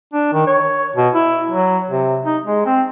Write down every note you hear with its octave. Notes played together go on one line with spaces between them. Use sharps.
D4
D#3
C#5
B2
E4
F#3
C3
D#4
G#3
C4